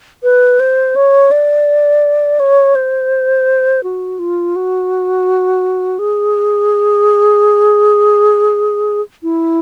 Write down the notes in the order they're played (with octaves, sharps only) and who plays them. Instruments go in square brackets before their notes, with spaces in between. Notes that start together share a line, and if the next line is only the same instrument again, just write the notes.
[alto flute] B4
C5
C#5
D5
C#5
C5
F#4
F4
F#4
G#4
E4